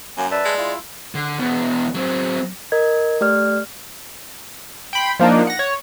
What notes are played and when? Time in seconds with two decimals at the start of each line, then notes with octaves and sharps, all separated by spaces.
0.17 F#2 F#3 A#3 G#5
0.31 B4 D5 E5 A5
0.45 G#3
0.58 E4 F4
1.15 D3
1.40 E2 B2
1.95 F#3 C4
2.72 A#4 D#5 G#6
3.21 A3 G4 D5 F6
4.93 G5 B5 C6
5.19 F3 A#3 D4 D#4
5.47 F#5 A#6
5.59 C#5